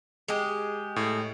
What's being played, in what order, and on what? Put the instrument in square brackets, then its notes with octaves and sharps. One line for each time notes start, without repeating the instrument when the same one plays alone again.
[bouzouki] G#3 G4
[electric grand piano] A2